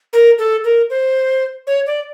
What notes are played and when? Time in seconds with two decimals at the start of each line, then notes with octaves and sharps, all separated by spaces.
0.13 A#4
0.38 A4
0.64 A#4
0.90 C5
1.67 C#5
1.87 D5